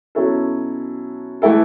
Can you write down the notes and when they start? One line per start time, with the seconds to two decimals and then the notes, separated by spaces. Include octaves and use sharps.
0.15 B2 F#3 C#4 E4 A4
1.42 E3 A3 E4 A4